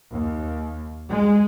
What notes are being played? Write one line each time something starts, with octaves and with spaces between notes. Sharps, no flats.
D#2
G#3